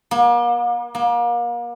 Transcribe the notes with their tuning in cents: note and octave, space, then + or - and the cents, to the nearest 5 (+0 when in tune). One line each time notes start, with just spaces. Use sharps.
A#3 +40
A#3 +35